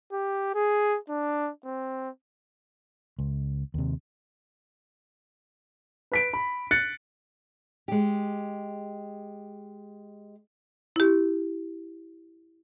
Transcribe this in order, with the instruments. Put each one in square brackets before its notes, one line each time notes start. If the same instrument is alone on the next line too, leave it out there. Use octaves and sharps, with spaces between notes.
[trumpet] G4
G#4
D4
C4
[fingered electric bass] C#2
D#2 C3
[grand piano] B4 B6 D7
B5
F#6 A6 C#7
[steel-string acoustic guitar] G#3 G4
[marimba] E4 G4